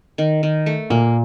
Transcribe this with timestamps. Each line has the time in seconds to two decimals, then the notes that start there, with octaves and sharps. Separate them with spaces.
0.18 D#3
0.43 D#3
0.66 A3
0.90 A#2 A#3